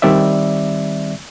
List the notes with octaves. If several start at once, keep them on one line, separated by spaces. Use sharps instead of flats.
D#3 G3 C4 D5 E5